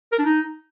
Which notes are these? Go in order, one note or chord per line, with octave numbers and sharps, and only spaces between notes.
A#4
D4
D#4